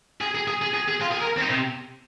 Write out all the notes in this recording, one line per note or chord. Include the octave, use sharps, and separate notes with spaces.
G#4
G#4
G#4
G#4
G#4
G#4
F4
G#4
A#4
C4
D#4
C3